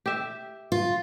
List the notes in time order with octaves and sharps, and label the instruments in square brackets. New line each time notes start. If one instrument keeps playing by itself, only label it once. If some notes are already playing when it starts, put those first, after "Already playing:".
[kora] G4 E5
[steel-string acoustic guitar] F4